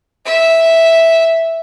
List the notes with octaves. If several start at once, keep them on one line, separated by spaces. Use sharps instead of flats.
E5